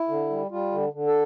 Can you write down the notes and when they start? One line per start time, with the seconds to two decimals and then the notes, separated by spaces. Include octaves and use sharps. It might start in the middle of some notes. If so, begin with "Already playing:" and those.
Already playing: E4
0.08 D3
0.30 G3
0.51 G3 F4
0.72 D3
0.93 D3
1.07 A4